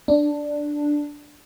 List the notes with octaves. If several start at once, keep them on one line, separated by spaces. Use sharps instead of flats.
D4